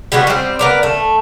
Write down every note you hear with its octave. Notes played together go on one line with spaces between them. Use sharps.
G3 G#3 B3 F#4
G3 C4
B3 A#4 D5
A3